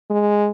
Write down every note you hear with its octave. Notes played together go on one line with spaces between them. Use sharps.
G#3